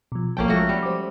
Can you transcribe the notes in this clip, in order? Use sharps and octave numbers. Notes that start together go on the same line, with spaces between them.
B2 F3
A1 F3 A#3 C#4 G5 A5
F3 G#3 A3 F#4
G3
C5 D6